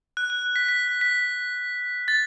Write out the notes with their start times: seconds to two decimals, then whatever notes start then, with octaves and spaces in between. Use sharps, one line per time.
0.17 F#6
0.30 F#6
0.56 B6
0.69 B6
1.01 B6
2.08 A6